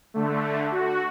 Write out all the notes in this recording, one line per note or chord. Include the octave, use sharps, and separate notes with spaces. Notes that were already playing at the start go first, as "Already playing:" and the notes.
D3 A3
F#4